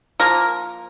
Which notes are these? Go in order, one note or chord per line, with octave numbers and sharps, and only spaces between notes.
F3 A#3 A#4